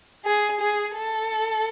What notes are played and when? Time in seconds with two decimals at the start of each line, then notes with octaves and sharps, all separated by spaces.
0.25 G#4
0.60 G#4
0.95 A4